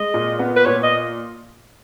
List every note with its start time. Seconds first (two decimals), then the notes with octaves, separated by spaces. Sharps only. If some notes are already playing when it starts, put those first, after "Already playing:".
Already playing: G#3 D#5
0.14 A#2
0.39 B3
0.57 B4
0.66 A#2 C#5
0.83 D#5